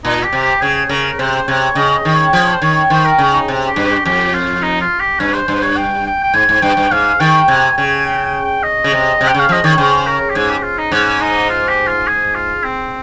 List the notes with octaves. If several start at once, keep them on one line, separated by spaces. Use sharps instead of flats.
A#2 D#4
G4
C3
G4
C#3 G#4
C#3 A#4
C3 C5
C3 C#5
C#3 D#5
D#5
D#3
C#5
F3 C#5
C5
D#3 C#5
D#3 C5
A#4
C#3
D#4
C3
G4
G2
G4
F2 G4
F4
D#4
F4
G4
G2 C#4
C5
G2 C5
C#5
G5
G5
G5
G#2 G#5
G#2
G2 G5
G2
G#2 F5
D#3 G5
C3 G#5
C#3 G#5
G5
G5
G5
D#5
C#3
C3
C3
G5
C#3
F5
F3 D#5
D#3 C#5
C#3 C5
A#4
G4
G#2 G#4
G4
F4
D#4
G#2 C#4
D#4
F4
G4
F4
G#4
F4
C4